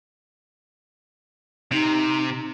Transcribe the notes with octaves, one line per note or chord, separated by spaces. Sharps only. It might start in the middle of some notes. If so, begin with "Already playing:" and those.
C3 D#4